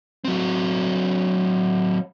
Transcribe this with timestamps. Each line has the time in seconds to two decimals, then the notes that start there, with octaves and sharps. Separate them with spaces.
0.25 F#3 C4